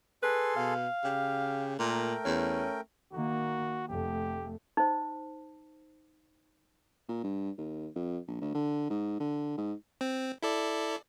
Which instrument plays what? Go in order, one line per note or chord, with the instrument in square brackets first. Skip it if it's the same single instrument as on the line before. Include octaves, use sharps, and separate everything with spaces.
[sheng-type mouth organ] G#4 A4 C6 [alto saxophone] B4
[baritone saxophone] B2 [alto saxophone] F5
[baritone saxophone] C#3 [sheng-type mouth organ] G4
[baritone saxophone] A#2 [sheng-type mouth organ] A3 A#4 G5
[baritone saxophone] E2 [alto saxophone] C#4
[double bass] D#3 A#3 [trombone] F#4
[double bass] F1 A3 [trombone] G4
[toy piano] D#4 C5
[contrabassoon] A#2
G2
D#2
F2
A#1
D2
D3
G#2
D3
G#2
[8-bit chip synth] C4
E4 A4 D5